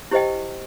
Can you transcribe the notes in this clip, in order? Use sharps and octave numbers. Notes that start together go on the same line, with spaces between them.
E4 G4 C5 D#5 G5